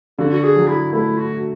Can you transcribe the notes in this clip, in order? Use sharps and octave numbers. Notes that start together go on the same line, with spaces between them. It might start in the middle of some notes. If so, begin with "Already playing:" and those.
D3 F#4
F#4
G#4
F#3
E4
A3 E4
F#4